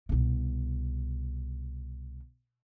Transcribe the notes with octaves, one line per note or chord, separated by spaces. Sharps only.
C2 B2